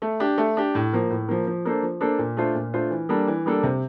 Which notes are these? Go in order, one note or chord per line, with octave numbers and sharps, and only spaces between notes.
A3
D4 G4
A3
D4 G4
A2
F3 A#3
A2
F3 A#3
F3
A#3 D4 A4 C5
F3
A#3 D4 A4 C5
A#2
A3 D4 F4 C5
A#2
A3 D4 F4 C5
E3
G3 A#3 D4 A4
E3
G3 A#3 D4 A4
C3